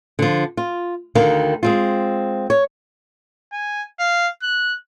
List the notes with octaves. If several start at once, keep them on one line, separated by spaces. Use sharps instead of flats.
D3 F3
F4
D2 D3 D#3 A#4 F5
G#3 C4 F4
C#5
G#5
F5
F#6